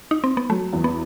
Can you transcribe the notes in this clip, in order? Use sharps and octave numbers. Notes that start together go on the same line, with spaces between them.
D#4
C4
B3
F#3 A3
E2
B3